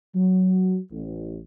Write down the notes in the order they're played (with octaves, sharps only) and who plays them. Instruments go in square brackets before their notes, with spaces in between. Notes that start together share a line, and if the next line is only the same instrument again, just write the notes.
[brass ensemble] F#3
A1